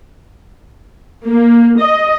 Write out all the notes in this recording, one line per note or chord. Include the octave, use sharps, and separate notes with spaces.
A#3
D#5